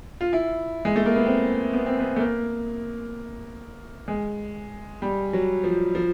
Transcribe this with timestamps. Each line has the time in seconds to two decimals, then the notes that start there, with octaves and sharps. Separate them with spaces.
0.21 F4
0.33 E4
0.85 G#3
0.96 A3
1.05 A#3
1.16 B3
1.26 C4
1.73 B3
1.86 C4
2.00 B3
2.16 A3
2.20 A#3
4.08 G#3
5.02 G3
5.33 F#3
5.64 F3
5.95 F3